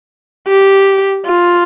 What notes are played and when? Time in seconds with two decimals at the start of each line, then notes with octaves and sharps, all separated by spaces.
0.48 G4
1.26 F4